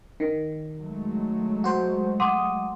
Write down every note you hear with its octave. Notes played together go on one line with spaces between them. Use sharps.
D#3
F#3 G#3 A3
F#4 C5
F#5 C6 D6 D#6